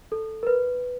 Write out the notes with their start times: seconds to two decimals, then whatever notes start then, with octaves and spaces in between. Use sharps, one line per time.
0.12 A4
0.43 A#4
0.47 B4